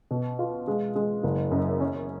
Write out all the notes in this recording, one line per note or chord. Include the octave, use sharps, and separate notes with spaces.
B2
F4
G#3
G#3
F#1
F#2
C#4